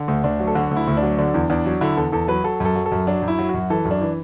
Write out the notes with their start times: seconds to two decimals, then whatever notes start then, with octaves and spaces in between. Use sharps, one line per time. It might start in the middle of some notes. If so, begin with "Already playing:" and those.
Already playing: D3
0.08 D2
0.24 D2 D4
0.40 F#3
0.47 A4
0.55 D3 F#4
0.71 D2
0.77 E4
0.87 D2
0.97 D4
1.03 F#3
1.19 D3 D4
1.34 E2
1.50 E2 D4
1.66 F#3
1.81 D3 E4
1.97 E2 A4
2.12 E2 A4
2.28 F#3 B4
2.44 F#3 A4
2.60 F#2 A4
2.76 F#3
2.86 A4
2.92 F#2
3.07 F#3 D4
3.22 F#2
3.28 E4
3.39 F#3
3.49 F#4
3.54 F#2
3.70 E3 A4
3.85 F#2
3.91 D4
4.01 E3